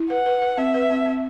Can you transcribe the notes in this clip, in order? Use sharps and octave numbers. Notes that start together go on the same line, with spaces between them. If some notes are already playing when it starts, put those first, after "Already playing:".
Already playing: E4
B4 F#5
B4
B4
C4 E5
B4
C4
C4